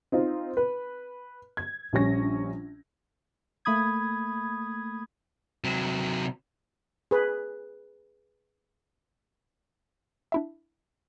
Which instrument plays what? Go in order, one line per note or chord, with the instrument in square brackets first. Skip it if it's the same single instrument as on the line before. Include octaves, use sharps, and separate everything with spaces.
[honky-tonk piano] C4 D#4 F4
B4
G#6
A#1 G3 C#4 A#6
[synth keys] A3 A#3 B5 D#6 G#6
[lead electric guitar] C3 F#3
[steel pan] G#4 B4
[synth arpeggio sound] D4 E4 E5